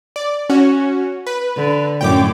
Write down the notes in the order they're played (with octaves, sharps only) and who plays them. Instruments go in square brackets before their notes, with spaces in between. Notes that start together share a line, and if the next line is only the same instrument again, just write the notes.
[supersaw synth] D5
C#4 F#4
B4
[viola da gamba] D3
[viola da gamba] F#2 A2 C#4 [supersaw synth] G5 D6